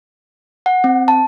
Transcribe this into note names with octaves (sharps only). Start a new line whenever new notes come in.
F#5
C4
A5